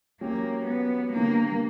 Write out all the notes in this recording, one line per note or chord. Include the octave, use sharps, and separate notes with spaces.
F#3 A#3 C#4 G4 C#5
B3
D3 G3 A#3 B3